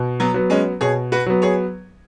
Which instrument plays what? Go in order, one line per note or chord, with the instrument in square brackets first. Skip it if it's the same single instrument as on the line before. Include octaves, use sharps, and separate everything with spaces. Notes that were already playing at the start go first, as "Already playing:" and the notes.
Already playing: [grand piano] B2
[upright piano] F#3 B3
[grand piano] F#3 B3
[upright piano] G#3 C#4
[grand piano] B2 [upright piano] G#4 C#5
[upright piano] F#4 B4
[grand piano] F#3 B3
[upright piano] G#4 C#5